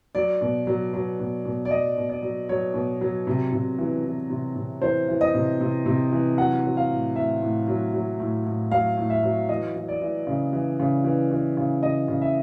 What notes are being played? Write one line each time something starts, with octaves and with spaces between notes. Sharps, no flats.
F#3 D5
B2
F#3
F#3
B2
B2
D5
F#3 D#5
B2
D5
F#3
F#3 C#5
B2
F#3
C3
C3
E3
E3
C3
C3
E3 C5
E3
D#5
C3
C3
C3
E3
F#3 F#5
F#3
F5
A2
A2 E5
A2
F#3
F#3
A2
A2
F#3 F5
A2
E5
F#3
E3 D#5
E3
D5
E3
C#3
E3
C#3
E3
E3
C#3
C#3 D#5
C#3
E5